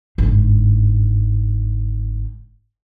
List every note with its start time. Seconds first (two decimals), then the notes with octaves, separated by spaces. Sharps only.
0.18 G1 G#2